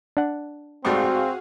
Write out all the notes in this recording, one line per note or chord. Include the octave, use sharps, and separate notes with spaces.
D4 F#5
G#2 G3 A3 C4 F#4 G#4 F5